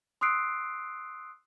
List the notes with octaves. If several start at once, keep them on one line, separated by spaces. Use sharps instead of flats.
C6 D#6 E6 F#6 C7 D7